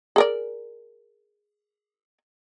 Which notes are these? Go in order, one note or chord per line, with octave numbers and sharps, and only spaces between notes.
G#4 A#4 D5